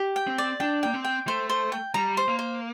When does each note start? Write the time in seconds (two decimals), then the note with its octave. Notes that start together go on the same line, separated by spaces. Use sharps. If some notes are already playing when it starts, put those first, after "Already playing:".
Already playing: G4
0.16 G5
0.27 C4
0.38 D5
0.60 D4 G5
0.83 A#3 G5
0.94 C4
1.05 G5
1.27 A3 C5
1.50 C5
1.72 G5
1.94 G3 A#5
2.17 C5
2.28 A#3
2.39 C5